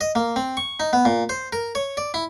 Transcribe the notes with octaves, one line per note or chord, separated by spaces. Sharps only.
D#5
A#3
C4
C#6
D#4
B3
A#2
C5
A#4
C#5
D5
E4